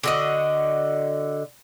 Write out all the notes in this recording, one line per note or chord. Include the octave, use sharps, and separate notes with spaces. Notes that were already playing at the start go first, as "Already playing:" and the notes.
D3 F#4 D#5